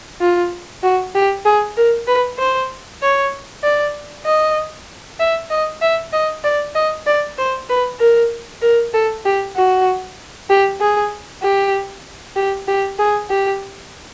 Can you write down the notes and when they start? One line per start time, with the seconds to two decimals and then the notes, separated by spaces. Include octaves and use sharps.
0.21 F4
0.83 F#4
1.15 G4
1.45 G#4
1.77 A#4
2.07 B4
2.38 C5
3.02 C#5
3.63 D5
4.25 D#5
5.19 E5
5.50 D#5
5.82 E5
6.13 D#5
6.44 D5
6.75 D#5
7.06 D5
7.38 C5
7.69 B4
8.00 A#4
8.62 A#4
8.93 A4
9.25 G4
9.56 F#4
10.50 G4
10.80 G#4
11.42 G4
12.36 G4
12.68 G4
12.99 G#4
13.29 G4